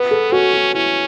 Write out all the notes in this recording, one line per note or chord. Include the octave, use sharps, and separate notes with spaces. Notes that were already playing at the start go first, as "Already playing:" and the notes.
Already playing: B3 B4
A4
C#4 F#4
F#4
C#4 E4